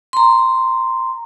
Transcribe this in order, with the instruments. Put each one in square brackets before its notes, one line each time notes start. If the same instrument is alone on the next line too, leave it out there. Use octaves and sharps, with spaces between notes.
[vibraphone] A#5 C6